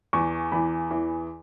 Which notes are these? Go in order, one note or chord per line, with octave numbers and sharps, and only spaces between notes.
E2 E3 C#6
E2 E3 B5
E2 E3